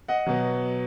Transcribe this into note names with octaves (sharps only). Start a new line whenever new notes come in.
D#5 F#5
B2 F#3